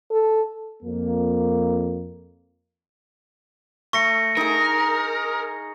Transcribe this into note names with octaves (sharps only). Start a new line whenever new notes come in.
A4
F2 A#3
A3 C#6 A#6 C#7
D#4 G#4 A#4